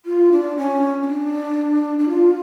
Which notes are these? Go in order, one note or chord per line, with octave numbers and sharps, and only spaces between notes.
F4
D4
C#4
C#4
D4
D4
F4